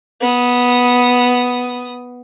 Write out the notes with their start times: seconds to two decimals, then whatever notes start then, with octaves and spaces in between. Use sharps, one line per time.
0.21 B3 D#6